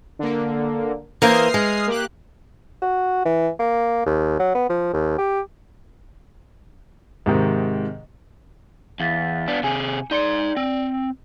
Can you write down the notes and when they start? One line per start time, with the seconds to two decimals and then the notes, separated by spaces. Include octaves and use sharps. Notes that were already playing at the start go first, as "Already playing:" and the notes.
0.19 D3 A#3
1.22 E3 A#3 C5 D#6 F6 C7
1.54 G#3
1.87 A#3 G4 F#6
2.82 F#4
3.25 E3
3.59 A#3
4.06 D#2
4.39 F#3
4.54 B3
4.69 F3
4.93 D#2
5.18 G4
7.26 G#2 C3 D#3
9.00 E2 F5 A6 B6
9.48 B3 D4
9.63 C3 G#4 G#5 C#7
10.11 D#4 D5 C6 C#7
10.57 C4